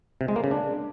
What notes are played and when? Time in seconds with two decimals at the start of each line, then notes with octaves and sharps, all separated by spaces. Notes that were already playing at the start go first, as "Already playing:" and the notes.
0.21 C3
0.28 G#3
0.36 A#3
0.44 C#3
0.51 D4